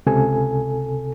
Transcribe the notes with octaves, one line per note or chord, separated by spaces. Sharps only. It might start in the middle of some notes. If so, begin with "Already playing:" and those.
C#2 C3 A4 G#5